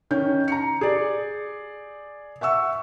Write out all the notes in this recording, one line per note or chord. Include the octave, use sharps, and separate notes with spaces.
D#3 C#4 G6
A#5 C#7
G#4 D5
E5 F#5 C#6 E6